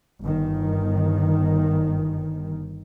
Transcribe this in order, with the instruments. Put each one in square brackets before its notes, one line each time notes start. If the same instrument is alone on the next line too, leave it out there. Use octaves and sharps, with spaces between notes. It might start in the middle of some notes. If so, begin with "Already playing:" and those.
[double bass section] G1 D#3